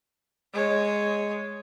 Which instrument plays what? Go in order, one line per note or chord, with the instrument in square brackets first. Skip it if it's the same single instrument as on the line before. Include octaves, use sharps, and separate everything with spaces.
[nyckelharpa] G#3 C#5